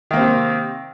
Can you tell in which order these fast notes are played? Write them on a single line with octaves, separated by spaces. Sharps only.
D#3 A#3 C4 C3